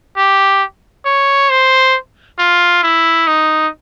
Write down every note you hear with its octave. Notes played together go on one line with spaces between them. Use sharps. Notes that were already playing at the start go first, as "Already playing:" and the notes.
G4
C#5
C5
F4
E4
D#4